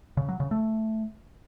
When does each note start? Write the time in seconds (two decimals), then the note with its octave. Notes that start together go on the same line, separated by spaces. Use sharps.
0.17 C#3
0.29 F#3
0.40 C#3
0.51 A3